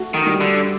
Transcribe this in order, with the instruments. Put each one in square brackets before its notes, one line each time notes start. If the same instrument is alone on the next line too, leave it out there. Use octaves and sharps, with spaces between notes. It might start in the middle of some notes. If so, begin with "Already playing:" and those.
Already playing: [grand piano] A3 F#4
[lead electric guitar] D#3
[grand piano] G3
[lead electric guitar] D3